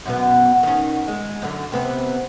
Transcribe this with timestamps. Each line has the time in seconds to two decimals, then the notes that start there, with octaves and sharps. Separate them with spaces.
0.06 F#2 B2 B3
0.63 D#3 C#4
1.08 G#3
1.42 F#2 D3
1.72 C3 B3 C4